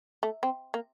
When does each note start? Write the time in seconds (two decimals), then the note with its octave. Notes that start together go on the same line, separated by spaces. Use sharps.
0.23 A3
0.43 C4
0.74 A#3